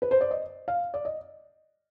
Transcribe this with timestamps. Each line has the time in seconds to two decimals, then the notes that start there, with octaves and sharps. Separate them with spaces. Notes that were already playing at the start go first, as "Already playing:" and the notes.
0.02 B4
0.11 C5
0.21 D5
0.31 D#5
0.68 F5
0.94 D5
1.05 D#5